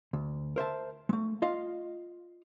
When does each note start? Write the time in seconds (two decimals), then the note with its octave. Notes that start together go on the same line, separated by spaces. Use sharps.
0.13 D2
0.56 A#4 C5 E5 A5
1.09 G#3 A3
1.42 F4 D#5 F5